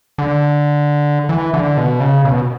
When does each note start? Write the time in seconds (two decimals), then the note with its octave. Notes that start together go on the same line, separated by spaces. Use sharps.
0.18 D3
1.29 E3
1.54 D3
1.77 B2
2.00 C#3
2.25 B2